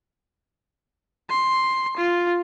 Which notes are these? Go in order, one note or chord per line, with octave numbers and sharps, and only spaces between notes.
C6
F4